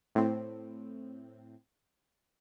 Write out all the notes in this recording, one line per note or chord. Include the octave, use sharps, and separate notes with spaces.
A2 C4